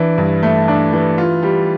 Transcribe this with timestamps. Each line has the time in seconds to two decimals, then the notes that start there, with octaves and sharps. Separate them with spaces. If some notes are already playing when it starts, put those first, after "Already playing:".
Already playing: E3 D4
0.18 G2
0.43 A3
0.68 D4
0.93 E3
1.18 F4
1.43 G3